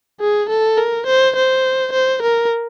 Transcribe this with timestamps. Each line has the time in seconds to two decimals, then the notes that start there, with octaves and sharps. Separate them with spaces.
0.20 G#4
0.49 A4
0.77 A#4
1.06 C5
1.36 C5
1.92 C5
2.22 A#4